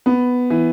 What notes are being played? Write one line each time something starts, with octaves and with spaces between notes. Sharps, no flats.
B3
E3